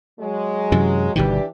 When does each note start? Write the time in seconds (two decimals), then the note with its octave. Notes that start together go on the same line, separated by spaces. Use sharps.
0.20 F#3 G#3
0.72 F#2 C3 E3
1.16 G1 B2 D#3 E3 D4 G4